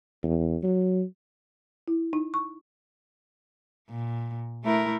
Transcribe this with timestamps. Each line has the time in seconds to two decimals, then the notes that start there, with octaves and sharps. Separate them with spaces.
0.24 E2
0.63 F#3
1.88 E4
2.13 D#4
2.34 C#6
3.89 A#2
4.64 A3 E4 A#4